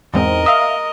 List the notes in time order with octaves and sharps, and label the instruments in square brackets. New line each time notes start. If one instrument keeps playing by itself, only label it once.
[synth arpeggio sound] E2 G#2 C4 [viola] A#4 D#5
[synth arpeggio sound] E5 F5 [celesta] D#6